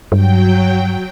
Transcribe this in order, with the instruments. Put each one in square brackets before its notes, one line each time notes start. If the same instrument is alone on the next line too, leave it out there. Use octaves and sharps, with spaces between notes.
[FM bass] G2 [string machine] F#3 G5